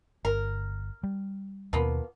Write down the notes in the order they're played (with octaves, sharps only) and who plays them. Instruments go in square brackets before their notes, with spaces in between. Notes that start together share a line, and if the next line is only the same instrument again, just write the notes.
[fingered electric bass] G1 [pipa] A#4
[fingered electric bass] G3
[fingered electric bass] D#2 B2 [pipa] F3 A#3 B3